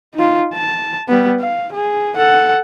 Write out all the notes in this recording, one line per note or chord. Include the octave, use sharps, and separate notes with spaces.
D#4 F4
A5
G3 B3
F5
G#4
A4 F#5